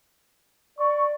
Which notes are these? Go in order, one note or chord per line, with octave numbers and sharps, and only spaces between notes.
D5 C#6